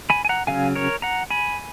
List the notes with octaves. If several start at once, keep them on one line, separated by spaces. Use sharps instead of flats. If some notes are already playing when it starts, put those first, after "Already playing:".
G#5 B5
G#5
F#5 A#5
C#3 F#3 C#4 F5 G#5
A#4 C#5
F#5 A#5
G#5 B5